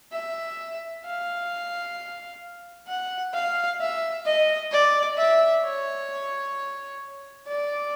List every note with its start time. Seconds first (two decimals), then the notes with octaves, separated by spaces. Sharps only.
0.12 E5
1.05 F5
2.88 F#5
3.34 F5
3.81 E5
4.26 D#5
4.72 D5
5.18 E5
5.64 C#5
7.48 D5